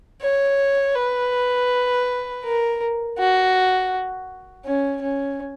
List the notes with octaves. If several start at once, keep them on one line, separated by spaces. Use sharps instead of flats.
C#5
B4
A#4
F#4
C#4
C#4